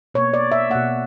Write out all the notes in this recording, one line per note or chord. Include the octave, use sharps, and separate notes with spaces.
B2 A#3 C#5
D5
E5
B2 A#3 F#5